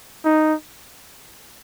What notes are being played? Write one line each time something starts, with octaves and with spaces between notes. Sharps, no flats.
D#4